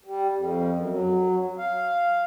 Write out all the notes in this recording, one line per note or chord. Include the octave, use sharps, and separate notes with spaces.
G3
F2
F#2
F#3
F5